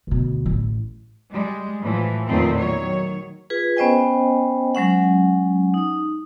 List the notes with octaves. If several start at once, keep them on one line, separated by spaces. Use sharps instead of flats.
D2 B2
A1
G3 G#3
A2 E3 F3
E2 A#2 D#3 F3 A3 C4
D#3 F#3 C#5
F4 G#4 B4
B3 C#4 C5 D#5 G5 G#5
F#3 G#3 C#4 F#5
D#4 D#6